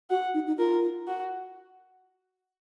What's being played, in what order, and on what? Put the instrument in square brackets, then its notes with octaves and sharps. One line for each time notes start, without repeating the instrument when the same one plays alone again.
[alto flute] F#4 [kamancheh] F#5
[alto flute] D#4
D#4
[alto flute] F4 [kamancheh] A#4
[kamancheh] F#4